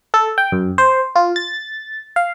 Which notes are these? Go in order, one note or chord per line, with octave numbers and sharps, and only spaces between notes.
A4
G5
F#2
C5
F4
A6
F5